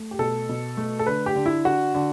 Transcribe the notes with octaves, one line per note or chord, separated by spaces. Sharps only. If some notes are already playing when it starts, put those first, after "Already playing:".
Already playing: A3
G4
B2 A4
B2
A3
A4
D3 B4
G4
D3
E4
D3 F#4
D3